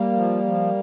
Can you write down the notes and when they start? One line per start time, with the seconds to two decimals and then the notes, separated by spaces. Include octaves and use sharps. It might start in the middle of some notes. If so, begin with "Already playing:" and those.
Already playing: G3 A#3
0.12 F3
0.44 F3